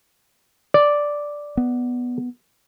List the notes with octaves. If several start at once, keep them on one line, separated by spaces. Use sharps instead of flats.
D5
B3